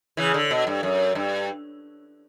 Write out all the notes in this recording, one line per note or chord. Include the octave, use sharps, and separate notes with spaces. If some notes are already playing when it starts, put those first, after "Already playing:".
C#3 E3
D3
B2
G2
F#2
G2